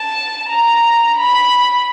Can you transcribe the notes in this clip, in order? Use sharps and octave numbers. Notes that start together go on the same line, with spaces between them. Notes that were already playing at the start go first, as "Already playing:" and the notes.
Already playing: A5
A#5
B5